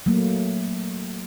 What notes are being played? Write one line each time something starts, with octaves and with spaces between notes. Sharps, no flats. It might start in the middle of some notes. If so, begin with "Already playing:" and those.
F#3 A3 A#3